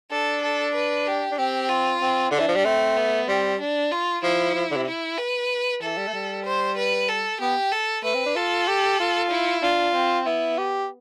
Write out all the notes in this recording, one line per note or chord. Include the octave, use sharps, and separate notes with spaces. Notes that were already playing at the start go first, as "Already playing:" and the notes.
D4 A4
A4
B4
G4
D4
C4 G4
F4
C4
D3 D4
E3
F3
G3
A3 C4
B3
G3 C4
D4
F4
F3 E4
F3
D3
C3
E4
B4
E3 A4
G3
A3
G3
C5
B4
A4
B3 G4
A4
A3 B4
C4
D4
F4 A4
G4
F4
E4
D4 F4
C4
B3 E4
G4